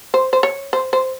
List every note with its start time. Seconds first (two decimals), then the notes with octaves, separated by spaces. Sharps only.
0.14 C5
0.33 C5
0.43 C#5
0.73 C5
0.93 C5